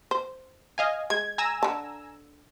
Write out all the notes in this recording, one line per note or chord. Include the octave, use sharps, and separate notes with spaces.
C5
D#5 F5 G#5
G#3 G#6
G#5 A#5 E6
D3 A5